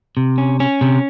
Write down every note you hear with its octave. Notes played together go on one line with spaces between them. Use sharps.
C3
C#4
C#4
C3